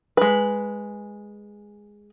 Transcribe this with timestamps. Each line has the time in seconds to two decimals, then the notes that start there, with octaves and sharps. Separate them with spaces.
0.17 G#3 B4